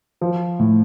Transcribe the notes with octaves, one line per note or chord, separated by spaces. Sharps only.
F3
A2